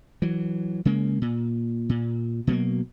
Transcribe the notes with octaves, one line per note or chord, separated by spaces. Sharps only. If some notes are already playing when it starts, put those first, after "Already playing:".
E3 F#3
C#3 G#3 A#3
A#2
A#2
B2 F#3 G#3 A#3